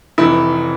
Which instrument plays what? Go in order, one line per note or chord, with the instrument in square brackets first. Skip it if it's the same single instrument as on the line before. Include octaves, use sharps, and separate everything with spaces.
[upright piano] F1 F2 E3 E4